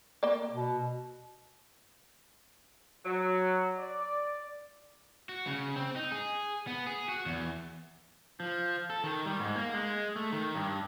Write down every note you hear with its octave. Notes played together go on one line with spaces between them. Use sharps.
A#3 D5
B2
F#3
D5
F#4
C#3
C4
D#4
G#4
B3
G#4
F#4
E2
F3
A4
D#3
G3
G#2
A#3
G#3
A3
D#3
G2